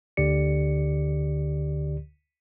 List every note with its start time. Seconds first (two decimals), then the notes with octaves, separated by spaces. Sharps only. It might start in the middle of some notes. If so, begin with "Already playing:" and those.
0.17 D2 D3 G4 D5 C#7